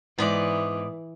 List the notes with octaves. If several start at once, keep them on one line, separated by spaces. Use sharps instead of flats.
G#2 E3 B3 D5 D6